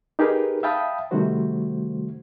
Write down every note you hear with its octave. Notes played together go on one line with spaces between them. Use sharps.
D#4 G4 G#4 A#4 B4
E5 F5 G5 A5 B5 D#6
C3 D#3 G3 A3 F#4 C5